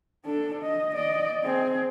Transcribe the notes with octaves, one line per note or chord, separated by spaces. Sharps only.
D4 A4
D#5
D5 D#5
C4 G#4